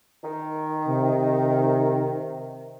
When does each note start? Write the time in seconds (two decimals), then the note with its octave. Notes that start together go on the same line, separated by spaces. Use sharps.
0.23 D#3
0.88 C3